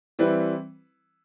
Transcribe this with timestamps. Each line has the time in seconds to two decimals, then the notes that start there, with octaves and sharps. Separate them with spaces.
0.19 E3 G3 C4 E4 B4